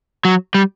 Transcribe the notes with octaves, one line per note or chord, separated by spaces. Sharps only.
F#3
G3